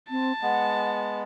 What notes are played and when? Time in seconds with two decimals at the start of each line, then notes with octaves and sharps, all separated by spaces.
0.10 C4 A5
0.42 G#3 B3 F#5